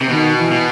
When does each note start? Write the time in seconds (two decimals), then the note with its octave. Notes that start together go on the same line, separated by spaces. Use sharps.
0.01 C3
0.09 B2 D#3
0.37 E3
0.51 B2